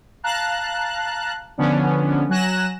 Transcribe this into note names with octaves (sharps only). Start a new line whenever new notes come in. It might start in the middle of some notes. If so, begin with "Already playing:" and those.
F5 A5 A#5 F#6
D3 F3 B3 C#4 D4
F#3 G#5 F#6 A#6 E7